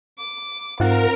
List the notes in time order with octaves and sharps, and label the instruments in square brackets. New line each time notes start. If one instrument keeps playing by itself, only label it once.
[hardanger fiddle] D6
[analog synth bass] G#2 [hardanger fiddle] C4 [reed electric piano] F4 F5 F#5 [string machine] A#4